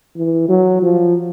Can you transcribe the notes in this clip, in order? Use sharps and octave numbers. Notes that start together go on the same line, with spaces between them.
E3
F#3
F3